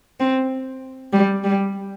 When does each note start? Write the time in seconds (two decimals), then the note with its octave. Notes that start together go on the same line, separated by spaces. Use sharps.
0.20 C4
1.13 G3
1.44 G3